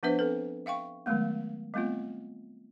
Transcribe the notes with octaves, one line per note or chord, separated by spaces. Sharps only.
F3 B3 D4 B4 C5 E5
C4 A4 B4
E5 F5 G5 C#6
D#3 F#3 G#3 A3 B3
G3 A3 B3 C4 F4